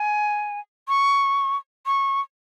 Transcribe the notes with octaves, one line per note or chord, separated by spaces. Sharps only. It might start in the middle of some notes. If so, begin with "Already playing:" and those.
Already playing: G#5
C#6
C#6